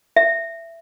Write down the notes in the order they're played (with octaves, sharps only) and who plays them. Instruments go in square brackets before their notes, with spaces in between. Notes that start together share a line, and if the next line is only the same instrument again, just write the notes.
[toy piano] E5